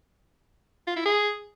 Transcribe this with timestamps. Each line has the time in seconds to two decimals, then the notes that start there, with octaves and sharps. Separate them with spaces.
0.87 F4
0.96 E4
1.06 G#4